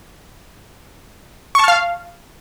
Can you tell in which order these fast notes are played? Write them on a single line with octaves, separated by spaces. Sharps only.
C#6 A5 F6 F5